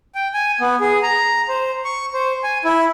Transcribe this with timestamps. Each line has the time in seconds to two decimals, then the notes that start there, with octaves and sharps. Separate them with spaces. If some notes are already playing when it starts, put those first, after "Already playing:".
0.15 G5
0.34 G#5
0.61 B3
0.80 G#4
1.03 A#5
1.49 C5
1.85 C#6
2.14 C5
2.44 G#5
2.65 E4